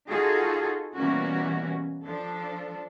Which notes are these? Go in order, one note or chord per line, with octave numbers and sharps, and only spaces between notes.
D#4 F4 F#4 G#4 A4
B2 E3 G3 A#3 C#4 F#4
F3 D4 A4